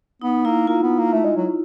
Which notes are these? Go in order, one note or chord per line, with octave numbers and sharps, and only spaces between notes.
B3 D#4
A#3 E4
A#3 F4
B3
A#3
A3
G#3
F#3